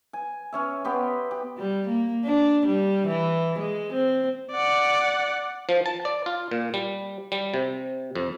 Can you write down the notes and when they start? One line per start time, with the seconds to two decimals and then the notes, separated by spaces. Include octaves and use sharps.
0.13 G#5
0.53 C#4 C#5 E5
0.84 B3 G4 C6
1.31 G4
1.58 G3
1.88 A#3
2.25 D4
2.67 G3
3.08 E3
3.59 G#3
3.93 C4
4.52 D5 F#5
5.69 F3
5.86 A5
6.05 D5
6.26 F4
6.51 A#2
6.74 G3
7.32 G3
7.54 C3
8.15 F2